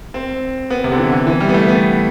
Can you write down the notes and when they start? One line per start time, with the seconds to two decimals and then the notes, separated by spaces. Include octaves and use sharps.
0.14 C4
0.70 B3
0.84 C3
0.92 D3
0.98 E3
1.12 D3
1.27 E3
1.40 G3
1.49 B3
1.54 A3
1.68 B3